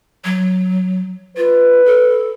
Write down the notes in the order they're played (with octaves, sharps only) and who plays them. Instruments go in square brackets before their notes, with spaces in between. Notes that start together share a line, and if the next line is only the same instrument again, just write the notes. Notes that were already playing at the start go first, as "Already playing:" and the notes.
[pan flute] F#3
[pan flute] F4 [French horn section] B4
[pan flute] A4